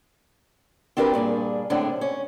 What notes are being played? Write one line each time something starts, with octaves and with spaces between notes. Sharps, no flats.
C4 D4 E4 G4 A#4 B4
G2 A#2 D4 G#4
F#2 A2 D3 G#3 C4 D4
C#4